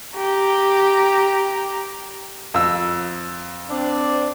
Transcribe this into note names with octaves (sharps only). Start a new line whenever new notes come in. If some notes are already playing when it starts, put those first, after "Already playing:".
G4 A#5
F2 E6
C4 D4 D5